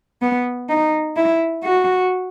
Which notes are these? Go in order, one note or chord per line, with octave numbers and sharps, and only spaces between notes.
B3
D#4
E4
F#4